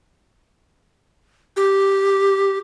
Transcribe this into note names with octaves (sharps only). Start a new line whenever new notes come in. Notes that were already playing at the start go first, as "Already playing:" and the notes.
G4